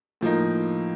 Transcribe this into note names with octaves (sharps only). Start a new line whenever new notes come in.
A2 F3 A#3 D#4